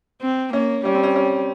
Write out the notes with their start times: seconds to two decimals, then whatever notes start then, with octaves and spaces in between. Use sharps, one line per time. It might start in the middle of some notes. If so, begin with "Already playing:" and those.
0.22 C4
0.53 A#3 C#4
0.84 G3 C#4
0.95 C4
1.03 C#4
1.16 C#4